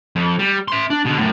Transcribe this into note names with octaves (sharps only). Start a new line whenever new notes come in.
F2
G3
E5 C6
D4
B2 D3
F#2 A2